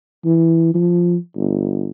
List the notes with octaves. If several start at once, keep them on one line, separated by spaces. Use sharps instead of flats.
E3
F3
G1